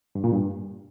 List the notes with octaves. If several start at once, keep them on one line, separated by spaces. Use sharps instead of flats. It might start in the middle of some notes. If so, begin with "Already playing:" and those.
G2
A#2
G2